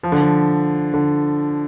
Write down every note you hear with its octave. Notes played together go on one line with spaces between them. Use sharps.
F3
D3
F3
D3